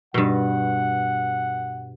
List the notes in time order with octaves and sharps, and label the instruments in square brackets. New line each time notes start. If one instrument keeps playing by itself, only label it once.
[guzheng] G2 B2 [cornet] F#5